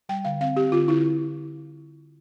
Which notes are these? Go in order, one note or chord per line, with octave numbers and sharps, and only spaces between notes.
G3 G5
D3 F5
C4 F5
C4 G4
D3 F4
D3 E4